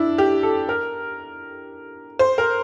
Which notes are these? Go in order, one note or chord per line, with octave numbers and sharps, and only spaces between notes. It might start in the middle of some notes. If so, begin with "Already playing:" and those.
Already playing: D4 E4
G4
A4
A#4
C5
A#4